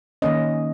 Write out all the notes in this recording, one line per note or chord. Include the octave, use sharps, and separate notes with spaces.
D#3 A#3 C#4 D#5